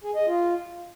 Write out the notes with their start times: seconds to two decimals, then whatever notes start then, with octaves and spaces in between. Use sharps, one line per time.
0.04 G#4
0.15 D#5
0.27 F4